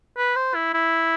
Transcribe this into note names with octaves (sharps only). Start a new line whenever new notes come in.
B4
C5
E4
E4